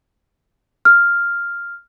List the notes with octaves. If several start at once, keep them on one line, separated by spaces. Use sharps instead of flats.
F6